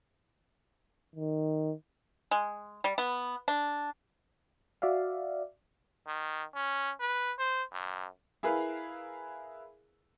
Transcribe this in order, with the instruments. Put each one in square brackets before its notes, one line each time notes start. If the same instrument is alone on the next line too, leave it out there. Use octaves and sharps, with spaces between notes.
[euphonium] D#3
[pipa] G#3
G3
B3
D4
[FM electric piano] F#4 D5 E5 F5
[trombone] D#3
C#4
B4
C5
F#2
[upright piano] E4 G#4 A#4 B4 F5